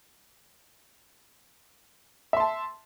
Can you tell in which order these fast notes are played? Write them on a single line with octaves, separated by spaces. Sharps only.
E5 C6 A5